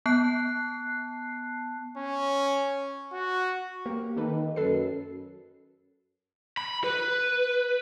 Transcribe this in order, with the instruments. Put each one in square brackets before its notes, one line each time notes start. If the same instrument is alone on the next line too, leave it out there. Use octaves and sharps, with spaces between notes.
[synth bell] B3 A5 F#6 C7
[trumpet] C#4
F#4
[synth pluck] A#3 G4 A#4
[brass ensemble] D#3 [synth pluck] A#3 A4 B4
[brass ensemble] F#2 [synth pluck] A4 B4 C7
[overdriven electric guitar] B5
B4